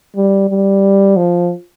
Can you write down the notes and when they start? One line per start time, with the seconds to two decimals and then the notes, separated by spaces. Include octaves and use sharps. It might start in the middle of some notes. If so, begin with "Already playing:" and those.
0.16 G3
0.49 G3
1.17 F3